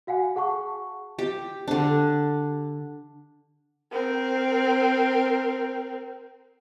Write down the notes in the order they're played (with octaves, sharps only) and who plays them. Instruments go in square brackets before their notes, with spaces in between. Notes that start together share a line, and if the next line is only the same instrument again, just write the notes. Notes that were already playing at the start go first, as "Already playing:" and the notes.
[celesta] F#4 F5 F#5 G#5
G#4 F#5 A5 C#6
[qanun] G4
D3 D4
[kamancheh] C4 A#4